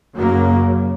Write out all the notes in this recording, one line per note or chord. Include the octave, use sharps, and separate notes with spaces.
F#2 C#3 F#3 A#3